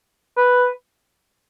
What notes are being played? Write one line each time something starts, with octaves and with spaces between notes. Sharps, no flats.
B4